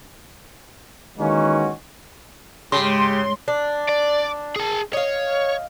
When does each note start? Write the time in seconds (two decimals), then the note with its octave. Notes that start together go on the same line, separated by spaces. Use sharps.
1.19 D#3 E3 G#3 A#3 C#4 F#4
2.72 G#2 C#3 G#3 G4 C6
3.48 D4
3.89 D5
4.56 G#4 A5
4.93 C#5 D#5 F5